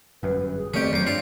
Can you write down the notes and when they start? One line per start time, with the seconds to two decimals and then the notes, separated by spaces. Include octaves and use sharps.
0.23 G1 F#2 B4
0.56 G#4
0.74 F2 D#3 A3 C4 C#4 G4 D5
0.93 F2 F#3 D6
1.07 G2 C4 F4